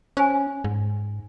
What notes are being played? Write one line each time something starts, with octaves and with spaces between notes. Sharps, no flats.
C#4 C5 G#5
G#2